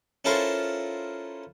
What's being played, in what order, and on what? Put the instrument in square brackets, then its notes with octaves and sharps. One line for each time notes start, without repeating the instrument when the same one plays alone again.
[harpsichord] C#4 E4 F4 A4 A#4 C5